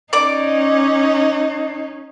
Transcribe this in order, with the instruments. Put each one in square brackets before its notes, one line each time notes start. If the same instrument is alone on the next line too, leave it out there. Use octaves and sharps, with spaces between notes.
[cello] C#4 D#4 [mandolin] D5 D6